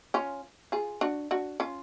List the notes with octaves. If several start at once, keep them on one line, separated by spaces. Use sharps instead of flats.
C#4 F4
F4 G#4
D4 F#4
D4 F#4
C#4 F4